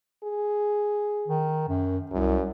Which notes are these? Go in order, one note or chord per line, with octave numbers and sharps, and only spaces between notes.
G#4
D#3
F#2
C2 F#2